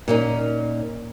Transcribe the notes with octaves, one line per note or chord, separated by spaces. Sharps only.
A#2 C#4 D#4